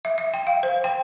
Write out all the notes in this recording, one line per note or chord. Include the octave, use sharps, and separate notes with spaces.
E5
E5
G5
F5
C5
G5